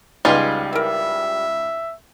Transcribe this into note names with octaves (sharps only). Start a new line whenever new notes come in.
C#2 G3 B3 D#4 G#4 F5 C6
E3 A#4 E5